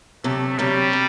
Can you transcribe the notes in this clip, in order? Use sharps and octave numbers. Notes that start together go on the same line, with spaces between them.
D2 C3 F#3 A3
D2 C3 F#3 G3
C3